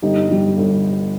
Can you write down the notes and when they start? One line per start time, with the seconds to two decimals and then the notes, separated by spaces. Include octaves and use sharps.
0.02 G1 D#4 G4
0.30 G2 G3
0.57 G1